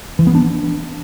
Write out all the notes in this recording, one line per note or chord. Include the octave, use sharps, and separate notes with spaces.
E3
B3
D4